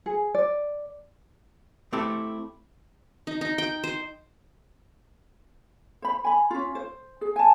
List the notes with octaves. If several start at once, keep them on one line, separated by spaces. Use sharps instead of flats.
G#4
D5
A3 C4 E4 G4 A4
D#4
D#4
G5
C5
C5 B5
G#5 B5
C#4 F4
C5
G#4
G#5 A5